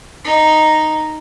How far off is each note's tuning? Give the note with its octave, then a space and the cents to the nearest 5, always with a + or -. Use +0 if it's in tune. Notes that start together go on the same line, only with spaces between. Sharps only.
D#4 -5